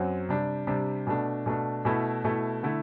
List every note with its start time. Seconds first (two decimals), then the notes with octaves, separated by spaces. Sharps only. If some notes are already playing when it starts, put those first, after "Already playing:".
Already playing: F#2 F#3 C4
0.29 C3 G3 D4
0.67 C3 G3 D4
1.07 B2 A3 D4
1.46 B2 A3 D4
1.85 B2 A3 E4
2.24 B2 A3 E4
2.63 D3 A3 E4